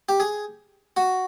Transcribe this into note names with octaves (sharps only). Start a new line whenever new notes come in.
G4
G#4
F#4